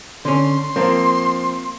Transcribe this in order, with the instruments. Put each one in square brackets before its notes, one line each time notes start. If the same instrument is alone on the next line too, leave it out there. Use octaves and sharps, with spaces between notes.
[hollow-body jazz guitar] D3 C#4 [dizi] C6
[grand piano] F3 C4 [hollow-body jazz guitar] A#3